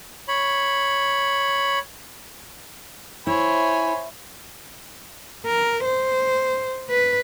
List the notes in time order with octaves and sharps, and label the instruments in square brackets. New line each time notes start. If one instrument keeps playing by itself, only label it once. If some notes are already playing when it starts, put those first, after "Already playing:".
[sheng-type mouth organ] C#5 B5
[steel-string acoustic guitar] E4 [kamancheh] C5 C#5 [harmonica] G#5 B5
[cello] A#4
C5
B4